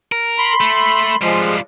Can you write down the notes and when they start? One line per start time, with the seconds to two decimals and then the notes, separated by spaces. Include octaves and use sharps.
0.12 A#4
0.38 B5 C6
0.61 A3
1.22 F3 G3 G#3 F4